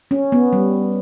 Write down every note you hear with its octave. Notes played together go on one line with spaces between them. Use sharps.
C#4
B3
G3